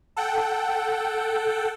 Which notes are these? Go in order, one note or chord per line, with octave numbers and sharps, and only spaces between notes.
A4 F#5 G5